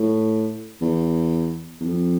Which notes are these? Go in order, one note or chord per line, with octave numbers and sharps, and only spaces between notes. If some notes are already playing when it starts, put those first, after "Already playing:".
Already playing: A2
E2
E2
F2